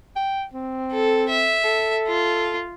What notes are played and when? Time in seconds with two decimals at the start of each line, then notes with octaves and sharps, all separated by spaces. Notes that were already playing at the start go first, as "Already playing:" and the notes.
0.16 G5
0.53 C4
0.92 A4
1.29 E5
1.64 A4
2.07 F4